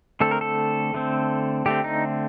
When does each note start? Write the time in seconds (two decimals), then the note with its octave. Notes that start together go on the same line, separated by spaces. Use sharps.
0.20 D3 A3 C4 A4
0.31 A#4
0.41 A4
0.94 D3 A3 C4
1.66 D3 A3 C4 G4
1.84 D#4